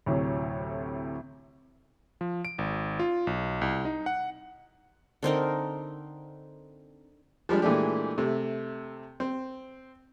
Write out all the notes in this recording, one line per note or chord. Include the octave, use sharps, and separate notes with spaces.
D2 A2 C3 F#3
F3
D7
G#1
F4
B1
C2
D#4
F#5
D3 C4 D#4 A#4
F3 G3 G#3 D4
A#2 E3 G#3 A3 D4 G4
C3 A3
C4